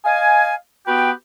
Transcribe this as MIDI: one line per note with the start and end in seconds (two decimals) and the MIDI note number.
0.05 0.54 75
0.05 0.54 77
0.05 0.54 80
0.87 1.11 59
0.87 1.11 66
0.87 1.11 67
0.87 1.11 71
0.87 1.11 79